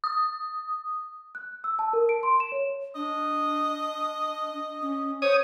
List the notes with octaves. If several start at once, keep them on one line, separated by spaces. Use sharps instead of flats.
D#6
F#6
E6
A5
A#4
D7
C6
E7
C#5
D4 D#5
C#4
C5 C#5 D#6